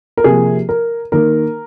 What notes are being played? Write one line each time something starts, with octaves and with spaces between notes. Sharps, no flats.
A#4
C3 F3 A#3 G#4
A#4
D#3 A#3 A#4